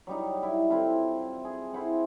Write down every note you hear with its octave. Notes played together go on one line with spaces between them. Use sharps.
F#3 G3 D#4
E4
C4 E4 F4 A4
G#4
E4 C5 F#5